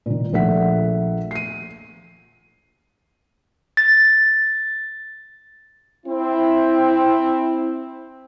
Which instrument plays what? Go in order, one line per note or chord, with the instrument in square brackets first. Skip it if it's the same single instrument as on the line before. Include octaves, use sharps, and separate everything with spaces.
[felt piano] A#2 D#3
A#1 A#2 A3 E5 F#5 B6
C7 D#7
[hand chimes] A6
[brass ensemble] C4 E4